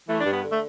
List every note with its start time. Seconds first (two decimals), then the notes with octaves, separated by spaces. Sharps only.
0.09 E3 A3
0.20 D4
0.26 G2
0.31 B3
0.44 D3
0.52 A3